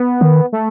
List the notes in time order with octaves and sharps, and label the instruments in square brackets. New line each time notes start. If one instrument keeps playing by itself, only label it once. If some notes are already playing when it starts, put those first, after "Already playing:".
Already playing: [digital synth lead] B3
[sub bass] D#3
[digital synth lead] A3